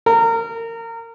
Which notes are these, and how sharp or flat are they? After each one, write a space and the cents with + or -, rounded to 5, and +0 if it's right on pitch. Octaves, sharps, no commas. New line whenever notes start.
A#4 -25